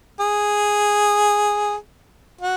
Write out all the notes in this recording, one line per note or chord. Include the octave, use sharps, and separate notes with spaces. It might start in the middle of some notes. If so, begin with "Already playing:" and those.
G#4
F#4